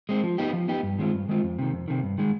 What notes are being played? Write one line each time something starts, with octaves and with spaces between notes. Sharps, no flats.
G#3 C4
F3
B3 D#4 G4
F3
B3 D#4 G4
G2
D#3 G#3 C4 F4
G2
D#3 G#3 C4 F4
F2
C3 D#3
F2
C3 D#3
G2
D#3 G#3